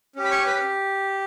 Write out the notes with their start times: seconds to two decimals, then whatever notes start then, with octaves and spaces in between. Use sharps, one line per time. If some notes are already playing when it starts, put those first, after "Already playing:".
0.16 C#4 G4
0.24 B5
0.31 C#5 C#6
0.46 B4 B5